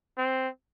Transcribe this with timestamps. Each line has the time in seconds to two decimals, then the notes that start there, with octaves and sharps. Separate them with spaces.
0.18 C4